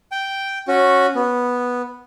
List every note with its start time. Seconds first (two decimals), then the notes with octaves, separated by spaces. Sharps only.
0.12 G5
0.68 C#4 F#4
1.15 B3